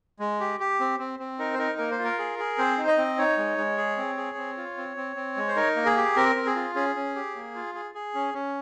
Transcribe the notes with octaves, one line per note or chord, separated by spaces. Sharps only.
G#3
G4
G4
C4
C4
C4
D#4 A#4
C5
D#4 A#4
A#3 A#4
C5
F4
A#4
G#4
G#4
C4 C5
D#4
D#5
C4
D#4 C#5
G#3
G#3
G#4
C4
G#4
C4
F4
C4
C4
C4
G#3
C5
D#4 A#4
A#3
G#4
G4
C4 A#4
C4
G#4
F4
C#4 G#4
C#4
G4
A#3
F4
G#4
G#4
C#4
C#4